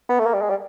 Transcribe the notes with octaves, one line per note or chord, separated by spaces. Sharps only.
B3
A3
A#3
G3
G#3
G3